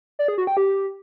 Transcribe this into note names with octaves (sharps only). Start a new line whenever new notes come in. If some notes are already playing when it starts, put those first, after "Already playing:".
D5
G#4
F#4
G5
G4